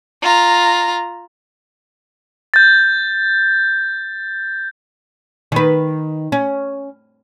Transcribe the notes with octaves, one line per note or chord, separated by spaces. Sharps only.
F4 A#5
G6 A6
D#3 B4
C#4